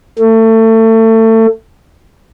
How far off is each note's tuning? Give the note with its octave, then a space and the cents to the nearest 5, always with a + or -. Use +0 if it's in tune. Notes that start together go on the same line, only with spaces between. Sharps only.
A3 +30